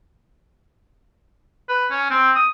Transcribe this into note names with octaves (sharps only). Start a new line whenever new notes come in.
B4
C#4
C4
D#6